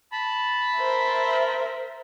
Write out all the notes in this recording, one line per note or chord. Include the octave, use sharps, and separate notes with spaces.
A5 B5
A#4 C5 E5